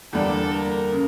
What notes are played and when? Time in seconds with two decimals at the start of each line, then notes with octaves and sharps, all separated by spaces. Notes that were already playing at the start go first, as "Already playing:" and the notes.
0.13 E2 D3 G3 A#3 D4 A4
0.52 A#4
0.92 C#3